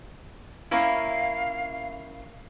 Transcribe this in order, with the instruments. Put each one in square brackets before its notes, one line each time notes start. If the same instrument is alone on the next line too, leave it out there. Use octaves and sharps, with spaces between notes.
[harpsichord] A#3 C#4 E4 [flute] F5